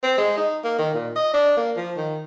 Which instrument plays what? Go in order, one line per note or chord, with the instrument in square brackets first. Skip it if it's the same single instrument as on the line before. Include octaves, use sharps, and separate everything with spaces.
[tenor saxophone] C4
G#3
D#4
A#3
D#3
A#2
D#5
D4
A#3
F3
D#3